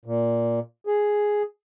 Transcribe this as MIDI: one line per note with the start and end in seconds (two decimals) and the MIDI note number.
0.05 0.60 46
0.87 1.43 68